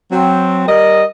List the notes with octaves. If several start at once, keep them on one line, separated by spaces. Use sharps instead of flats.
F#3 C4
G3 A#4 D#5